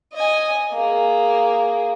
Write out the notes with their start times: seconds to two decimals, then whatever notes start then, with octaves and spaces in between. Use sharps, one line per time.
0.13 D#5 G#5
0.72 A#3 G#4